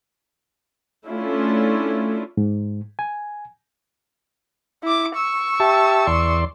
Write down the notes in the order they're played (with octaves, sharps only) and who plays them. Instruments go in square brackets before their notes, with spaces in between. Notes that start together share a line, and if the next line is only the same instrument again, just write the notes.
[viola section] A3 C#4 D4 E4 F4
[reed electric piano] G#2
G#5
[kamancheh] E4 D6
C#6 E6
[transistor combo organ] G4 E5 A5
E2 D5 C6